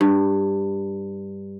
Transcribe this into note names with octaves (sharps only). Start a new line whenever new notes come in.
G2